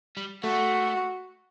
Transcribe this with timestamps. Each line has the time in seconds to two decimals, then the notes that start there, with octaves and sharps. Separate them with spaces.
0.17 G3
0.44 A3 F#4